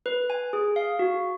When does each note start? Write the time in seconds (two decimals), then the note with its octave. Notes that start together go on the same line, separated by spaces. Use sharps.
0.06 B4
0.30 G#5
0.53 G#4
0.76 F5
0.99 F#4